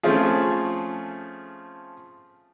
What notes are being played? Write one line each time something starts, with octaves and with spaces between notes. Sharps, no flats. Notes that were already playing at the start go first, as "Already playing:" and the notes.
F3 A3 C4 C#4 F4 G#4